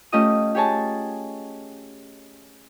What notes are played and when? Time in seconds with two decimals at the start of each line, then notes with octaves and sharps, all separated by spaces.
0.12 A3 C#4 F4 G4 D#5 D#6
0.55 G4 G#4 C#5 G#5 A5